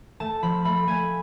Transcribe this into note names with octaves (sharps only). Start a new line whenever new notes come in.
A3 A5
F3 B5
A3 B5
A3 G#5